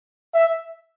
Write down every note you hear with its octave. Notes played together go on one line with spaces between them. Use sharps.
E5